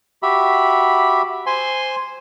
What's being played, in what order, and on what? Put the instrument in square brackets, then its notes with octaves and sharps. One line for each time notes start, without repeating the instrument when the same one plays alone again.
[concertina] F#4 G4 E5 B5
C5 G#5 C6